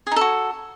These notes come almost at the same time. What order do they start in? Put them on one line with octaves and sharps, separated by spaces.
G#4 D#4 A4 F#4